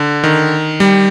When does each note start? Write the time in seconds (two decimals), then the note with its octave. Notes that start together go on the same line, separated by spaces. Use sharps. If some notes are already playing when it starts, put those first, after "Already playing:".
Already playing: D3
0.24 D#3
0.80 G3